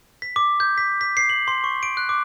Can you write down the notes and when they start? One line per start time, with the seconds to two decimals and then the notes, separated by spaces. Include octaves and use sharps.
0.22 B6
0.36 D6
0.60 G6
0.78 B6
1.01 B6
1.17 C7
1.30 F#7
1.48 C6
1.64 C#6
1.83 D7
1.97 F#6
2.09 D6